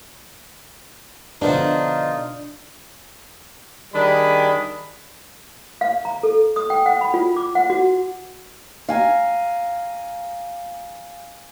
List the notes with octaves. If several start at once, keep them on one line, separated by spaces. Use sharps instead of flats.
B2 D3 F3 D4 D#4 F4
D#3 G3 D4 G#4 B5
F5
A#5
A4
D#6
G5
F#5
B5
F4
D6
F#5
F#4
F5 G#5 A#5